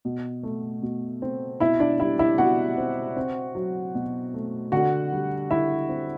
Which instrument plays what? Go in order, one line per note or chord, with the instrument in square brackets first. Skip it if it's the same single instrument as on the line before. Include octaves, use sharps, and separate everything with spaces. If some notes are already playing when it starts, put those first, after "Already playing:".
[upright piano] B2
A3
B2
C4
B2 E4 E5
D4 D5
G3 E4 E5
E4 E5
B2 F#4 F#5
C4
C4
F#3
B2
A3
D3 F#4 F#5
G3
D3 E4 E5
C4